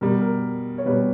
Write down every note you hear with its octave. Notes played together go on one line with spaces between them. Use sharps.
B2 G3 A#4
A#4
C#5
B2 G3 B4